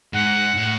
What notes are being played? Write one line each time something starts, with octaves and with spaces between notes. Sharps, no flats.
G#2 F#5
A2